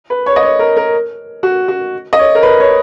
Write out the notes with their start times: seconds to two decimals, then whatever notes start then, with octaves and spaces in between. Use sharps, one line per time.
0.10 B4
0.26 C#5
0.36 D#5
0.43 C#5
0.59 A#4
0.76 A#4
1.43 F#4
1.68 F#4
2.13 D#5
2.19 C#5
2.35 A#4
2.43 B4
2.60 C#5